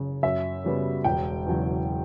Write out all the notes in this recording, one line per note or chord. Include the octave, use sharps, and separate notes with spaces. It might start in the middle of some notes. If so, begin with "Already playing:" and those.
Already playing: F#1 C#3
F#2 E5
C#3 G3 B3
E1 G5
E2 C#3 F#3